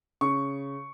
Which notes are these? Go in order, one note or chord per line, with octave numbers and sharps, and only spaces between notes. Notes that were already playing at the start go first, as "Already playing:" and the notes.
C#3 C#6